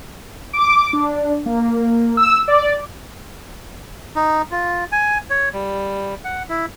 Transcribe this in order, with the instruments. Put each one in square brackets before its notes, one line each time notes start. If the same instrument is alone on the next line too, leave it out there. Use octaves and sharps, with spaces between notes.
[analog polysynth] D6
D4
A#3
E6
D5
[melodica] D#4
F4
G#5
C#5
G3
F#5
E4